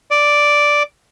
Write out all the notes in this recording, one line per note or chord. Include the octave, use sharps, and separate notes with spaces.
D5